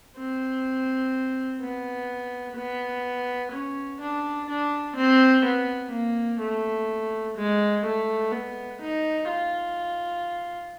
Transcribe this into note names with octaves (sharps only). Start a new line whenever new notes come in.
C4
B3
B3
C#4
D4
D4
C4
B3
A#3
A3
G#3
A3
B3
D#4
F4